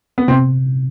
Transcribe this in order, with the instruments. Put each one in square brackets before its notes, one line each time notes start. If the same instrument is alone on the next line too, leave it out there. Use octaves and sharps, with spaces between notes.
[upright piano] B3
[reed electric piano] C3 [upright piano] C4